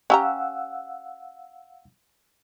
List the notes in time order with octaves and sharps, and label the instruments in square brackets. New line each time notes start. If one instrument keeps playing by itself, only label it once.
[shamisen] C#4 G4 A#5 [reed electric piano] F5 F#5 E6